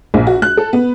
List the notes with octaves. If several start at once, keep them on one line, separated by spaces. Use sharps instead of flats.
A#1
F#4
F#6
A4
B3